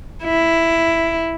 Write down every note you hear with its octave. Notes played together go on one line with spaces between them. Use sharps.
E4